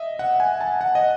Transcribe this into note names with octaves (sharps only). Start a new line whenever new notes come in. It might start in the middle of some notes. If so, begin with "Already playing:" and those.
Already playing: D#5 E5
F#5
G#5
A5
F#5
D#5